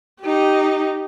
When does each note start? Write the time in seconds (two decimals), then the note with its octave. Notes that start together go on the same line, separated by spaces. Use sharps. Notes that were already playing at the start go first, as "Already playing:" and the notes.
0.21 D#4 G4